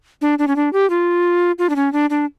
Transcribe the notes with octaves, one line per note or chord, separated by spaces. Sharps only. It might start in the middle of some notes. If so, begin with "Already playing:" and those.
D4
D4
C#4
D4
G4
F4
F4
D4
C#4
D4
D4